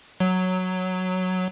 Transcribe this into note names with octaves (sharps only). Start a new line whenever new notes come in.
F#3